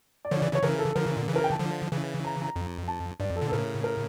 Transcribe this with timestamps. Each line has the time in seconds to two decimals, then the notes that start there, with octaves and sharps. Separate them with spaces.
0.25 D5
0.31 D3 F3 C#5
0.39 C#3 E3 D5
0.53 C#3 E3 C#5
0.63 C#3 E3 A#4
0.79 A4
0.95 D3 F3 A#4
1.06 C#3 E3
1.17 A#2 D3
1.28 C#3 E3
1.36 A#4
1.44 G5
1.52 A5
1.59 D3 F3
1.92 C#3 E3
2.24 A#5
2.42 A#5
2.56 F2
2.88 A5
3.20 G2 D5
3.30 F2
3.36 A4
3.41 A#2 D3
3.48 A4
3.52 A2 C#3 A#4
3.84 A#4